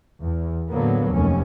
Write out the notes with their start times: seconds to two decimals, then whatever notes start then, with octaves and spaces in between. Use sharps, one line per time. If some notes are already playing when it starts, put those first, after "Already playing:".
0.22 E2
0.69 A2 D3 F#3 A#3 B3
1.11 F1 D#2 C#4